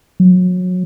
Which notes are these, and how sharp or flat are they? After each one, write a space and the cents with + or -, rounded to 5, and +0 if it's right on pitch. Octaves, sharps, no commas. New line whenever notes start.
F#3 -25